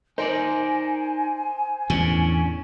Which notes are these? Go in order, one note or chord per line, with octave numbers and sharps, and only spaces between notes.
D#4 A#4 C5 D5 G#5
E2 A2 D3 C#4